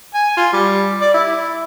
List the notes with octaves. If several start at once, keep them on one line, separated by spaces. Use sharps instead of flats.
G#5
F4
G3
D5
E4